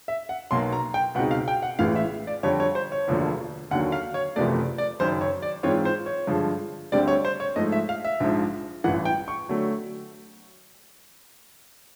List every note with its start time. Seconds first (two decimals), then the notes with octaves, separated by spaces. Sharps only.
0.08 E5
0.29 F#5
0.51 B1 B2 F#3 A#3 C6
0.72 A#5
0.94 G5
1.14 C#2 B2 G#3 C4 D#4 F#5
1.31 F5
1.48 G5
1.62 F#5
1.79 A1 A2 E3 G#3 F5
1.96 E5
2.27 D5
2.43 F2 D3 G3 C#5
2.60 C#5
2.75 C5
2.92 C#5
3.08 E1 D2 D3 F3 A#3
3.71 D#2 D3 F#3 A#3 F#5
3.92 F5
4.14 C#5
4.36 F#1 E2 C3 F3 A3 D5
4.78 D5
5.00 F#1 F#2 D#3 C5
5.21 C#5
5.42 D5
5.63 G#2 E3 G#3 C4 F4 C#5
5.85 C5
6.06 C#5
6.27 G2 D3 F3 G#3
6.92 D2 D3 G3 C4 D5
7.08 C#5
7.25 C5
7.40 C#5
7.56 G#2 F3 A3 D#5
7.72 E5
7.89 F5
8.05 E5
8.20 A#1 G#2 F3
8.84 A1 G2 E3 F#5
9.05 G5
9.28 C#6
9.49 D3 F#3 A3